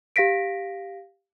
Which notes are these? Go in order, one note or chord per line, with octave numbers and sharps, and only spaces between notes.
G4 F5 A#6 B6 D7